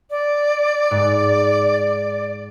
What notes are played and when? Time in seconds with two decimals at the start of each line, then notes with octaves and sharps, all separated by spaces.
0.10 D5
0.91 G#2